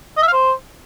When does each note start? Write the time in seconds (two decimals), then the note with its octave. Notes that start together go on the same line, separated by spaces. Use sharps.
0.17 D#5
0.22 E5
0.28 F5
0.33 C5